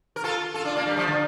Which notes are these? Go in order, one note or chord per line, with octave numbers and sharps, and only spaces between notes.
A#4
F4 A4
F4 A4
D4 F4
A#3 D4
G3 A#3
F3 A3
D3 F3